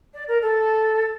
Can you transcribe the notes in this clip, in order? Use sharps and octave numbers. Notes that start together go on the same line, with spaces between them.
D5
A#4
A4